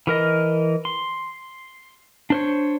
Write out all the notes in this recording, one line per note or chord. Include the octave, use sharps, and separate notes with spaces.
E3 A#4 D#5
C6
D4 C5 C#5